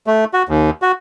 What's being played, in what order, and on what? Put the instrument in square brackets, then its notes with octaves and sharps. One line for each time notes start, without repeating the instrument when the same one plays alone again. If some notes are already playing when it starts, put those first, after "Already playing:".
[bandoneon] A3
F#4
D#2
F#4